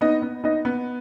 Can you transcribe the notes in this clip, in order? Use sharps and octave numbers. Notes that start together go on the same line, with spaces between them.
B3 D#4 D#5
B3
B3 D#4 D#5
B3